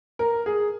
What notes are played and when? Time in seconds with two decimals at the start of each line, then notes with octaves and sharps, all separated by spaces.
0.19 A#4
0.46 G#4